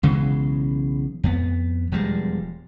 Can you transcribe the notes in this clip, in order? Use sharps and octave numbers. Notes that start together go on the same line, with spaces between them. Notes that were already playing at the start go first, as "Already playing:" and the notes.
B1 C#3 E3 G#3
F2 B3
E1 F3 G3 G#3